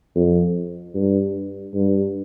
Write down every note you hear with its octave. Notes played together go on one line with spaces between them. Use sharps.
F2
G2
G2